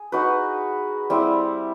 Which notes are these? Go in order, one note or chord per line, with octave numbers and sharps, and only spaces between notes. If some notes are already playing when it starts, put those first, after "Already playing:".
Already playing: G#4
D#4 F#4 B4
G3 C4 E4